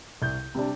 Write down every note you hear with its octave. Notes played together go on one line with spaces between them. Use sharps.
C2 G6
C3 G3 D4